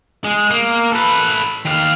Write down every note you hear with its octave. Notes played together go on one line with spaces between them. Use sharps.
G#3
A#3
A4 B4
D#3 F5